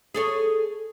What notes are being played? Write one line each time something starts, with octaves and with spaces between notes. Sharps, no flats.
G#4 A4 C#5